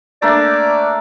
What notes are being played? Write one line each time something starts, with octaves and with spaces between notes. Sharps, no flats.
A3 A#3 D4 D5